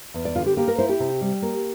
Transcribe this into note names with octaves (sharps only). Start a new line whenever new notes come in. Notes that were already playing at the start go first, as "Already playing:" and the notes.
E2
D5
D3 F4
G4
A#3 G4
A#4
E4 C5
G4
C3
G3
A#3